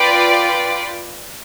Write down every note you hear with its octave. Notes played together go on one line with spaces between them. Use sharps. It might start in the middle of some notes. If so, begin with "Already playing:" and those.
Already playing: F4 B4 D5 G5